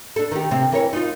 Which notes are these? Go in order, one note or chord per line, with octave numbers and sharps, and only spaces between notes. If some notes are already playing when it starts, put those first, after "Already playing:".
D4 A4
D#3 G4
C3 C4
E3 A#4 C#5
D#4 F4